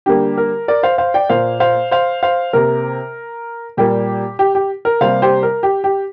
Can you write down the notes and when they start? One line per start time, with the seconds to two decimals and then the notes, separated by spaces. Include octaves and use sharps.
0.06 D3 G3 A#3 G4
0.38 A#4
0.68 A#4 D5
0.83 C5 F5
0.98 C5 F5
1.14 D5 G5
1.30 A#2 A#3 C5 F5
1.60 C5 F5
1.91 C5 F5
2.23 C5 F5
2.53 C3 A#3 A#4
3.77 A#2 G3 A#3 G4
4.39 G4
4.55 G4
4.85 A#4
5.01 C3 G3 A#3 C5 F5
5.22 G4 C5
5.43 A#4
5.63 G4
5.84 G4